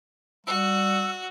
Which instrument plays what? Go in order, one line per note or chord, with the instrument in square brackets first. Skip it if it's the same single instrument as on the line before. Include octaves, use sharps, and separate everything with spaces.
[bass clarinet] G3 [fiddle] F#4 [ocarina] E6